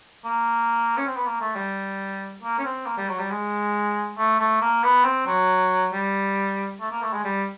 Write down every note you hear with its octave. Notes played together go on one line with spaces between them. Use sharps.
A#3
C#4
C4
B3
A#3
A3
G3
A#3
C#4
C4
A#3
G3
F#3
G3
G#3
A3
A3
A#3
B3
C4
F#3
G3
A3
A#3
A3
G#3
G3